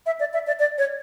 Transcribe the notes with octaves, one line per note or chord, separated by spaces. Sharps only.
E5
D5
E5
D5
D5
C#5